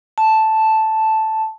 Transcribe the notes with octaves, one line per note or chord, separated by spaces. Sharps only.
A5